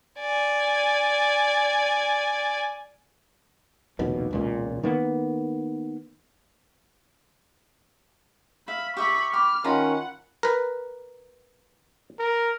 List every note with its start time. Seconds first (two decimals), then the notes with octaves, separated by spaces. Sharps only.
0.19 D5 G#5
3.99 F1 A#1 D#2 B2
4.31 E1 C#2 A#2
4.83 D#3 A#3 B3
8.68 E5 F5 B5
8.97 G4 E5 B5 C#6 D#6
9.33 G5 B5 D6 F6
9.64 D#3 C#4 F4 F#5 A#5 B5
10.43 A#4 B4
12.19 A#4